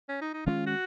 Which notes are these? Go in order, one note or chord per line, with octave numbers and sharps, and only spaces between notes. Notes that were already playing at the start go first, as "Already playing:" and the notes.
C#4
D#4
D#4
D#3 G#3 C#4 F4
F#4